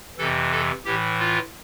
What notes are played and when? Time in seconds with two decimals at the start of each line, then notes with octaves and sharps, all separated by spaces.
0.18 F2 C3 E3 A4
0.51 A4
0.85 A2 E3 G4
1.19 F4